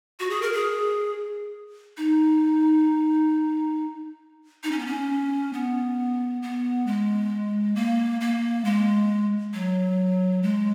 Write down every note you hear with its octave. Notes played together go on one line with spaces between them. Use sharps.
F#4
G#4
A#4
G#4
D#4
D#4
C#4
B3
C#4
B3
B3
G#3
A#3
A#3
G#3
F#3
G#3